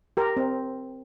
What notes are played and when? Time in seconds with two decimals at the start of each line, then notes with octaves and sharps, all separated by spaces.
0.17 G4 A#4
0.37 C4